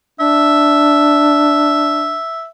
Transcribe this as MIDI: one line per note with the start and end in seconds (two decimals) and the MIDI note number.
0.20 2.18 62
0.20 2.47 76